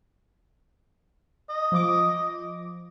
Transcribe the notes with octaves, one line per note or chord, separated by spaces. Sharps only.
D#5
F3 D6